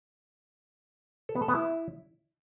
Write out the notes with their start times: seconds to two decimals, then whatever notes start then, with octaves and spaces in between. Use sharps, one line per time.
1.29 A4
1.35 B3
1.42 A4
1.48 B3
1.55 E4